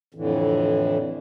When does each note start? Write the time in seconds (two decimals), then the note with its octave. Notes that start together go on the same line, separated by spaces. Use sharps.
0.14 F2 A2 D3 E3